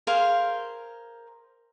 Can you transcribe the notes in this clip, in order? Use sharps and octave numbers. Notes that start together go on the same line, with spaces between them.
G#4 A#4 C5 F5